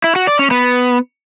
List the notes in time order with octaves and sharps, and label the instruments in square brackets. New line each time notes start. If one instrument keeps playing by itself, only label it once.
[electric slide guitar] E4
F#4
D5
C#4
B3